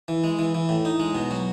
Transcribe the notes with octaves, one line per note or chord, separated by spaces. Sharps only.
E3
G#3
E3
E3
A2
D#4
G#3
B2
F#3